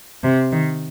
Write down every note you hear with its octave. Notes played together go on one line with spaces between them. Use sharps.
C3
D#3